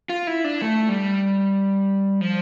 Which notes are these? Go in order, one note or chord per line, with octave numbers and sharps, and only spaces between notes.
F4
E4
D4
A3
G3
F3